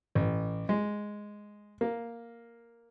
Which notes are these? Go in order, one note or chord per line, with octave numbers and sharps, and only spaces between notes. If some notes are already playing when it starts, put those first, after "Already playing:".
A1
G#3
A#3